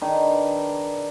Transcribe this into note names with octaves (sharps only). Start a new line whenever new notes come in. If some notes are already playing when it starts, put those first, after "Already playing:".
D#3 D4 G#4 B4